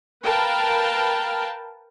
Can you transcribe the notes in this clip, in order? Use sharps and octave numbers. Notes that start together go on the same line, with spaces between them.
A#4 B4 F5 G5 A5